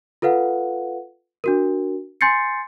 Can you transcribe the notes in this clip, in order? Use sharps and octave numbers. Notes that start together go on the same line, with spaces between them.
F4 A4 B4 F5 F#5
D4 F#4 A#4
G#5 C6 G6 A6 C7 C#7